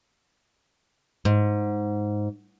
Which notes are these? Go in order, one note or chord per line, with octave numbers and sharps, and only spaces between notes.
G#2